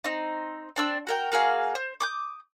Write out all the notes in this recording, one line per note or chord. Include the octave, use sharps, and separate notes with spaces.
C4 D#4
C4 D4 E6
F#4 A#4 G5
A#3 F#4 G#4 F5
C5
D6 D#6 G6